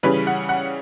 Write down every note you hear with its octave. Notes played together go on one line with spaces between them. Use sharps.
C#3 E3 G3 C#4 B4
F#5
F#5